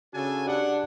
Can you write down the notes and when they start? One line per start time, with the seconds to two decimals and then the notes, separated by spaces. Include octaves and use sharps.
0.14 C#3 C#4 D4 F#4 A4 G#5
0.47 D4 G4 D5 F#5 A5